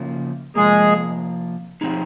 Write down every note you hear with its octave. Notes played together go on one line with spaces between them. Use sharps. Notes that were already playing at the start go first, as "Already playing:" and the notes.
Already playing: C#3 F3 A#3
C3 F3 G#3 A#3 G#4
F3 C4 D#4 G#4